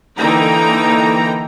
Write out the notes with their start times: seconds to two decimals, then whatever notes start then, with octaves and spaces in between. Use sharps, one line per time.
0.17 D3 E3 A#3 D#4 G5 A#5